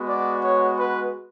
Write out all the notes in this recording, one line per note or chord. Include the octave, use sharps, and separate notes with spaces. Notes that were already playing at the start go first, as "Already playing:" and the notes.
Already playing: G#3 B3 F#4
D5
C#5
B4